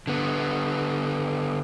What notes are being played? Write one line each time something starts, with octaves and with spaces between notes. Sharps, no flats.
D3 B3